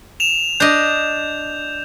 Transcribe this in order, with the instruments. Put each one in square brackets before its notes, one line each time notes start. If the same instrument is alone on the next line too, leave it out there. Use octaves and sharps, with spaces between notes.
[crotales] E7 F7
[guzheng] D4 D#5 [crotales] G6